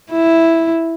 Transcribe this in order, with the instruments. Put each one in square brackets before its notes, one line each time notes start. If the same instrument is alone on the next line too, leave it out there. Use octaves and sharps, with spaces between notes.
[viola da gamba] E4